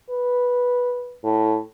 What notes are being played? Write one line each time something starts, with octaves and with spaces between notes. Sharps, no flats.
B4
A2